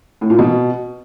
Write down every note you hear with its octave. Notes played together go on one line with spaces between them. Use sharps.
A2
A#2
B2